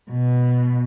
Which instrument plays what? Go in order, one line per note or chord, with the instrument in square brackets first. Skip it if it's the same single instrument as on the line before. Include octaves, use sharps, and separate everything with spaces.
[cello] B2